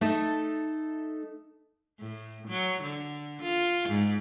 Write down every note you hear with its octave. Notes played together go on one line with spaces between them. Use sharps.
A3 D#4 A4 E5
A2
F#3
D3
F4
G#2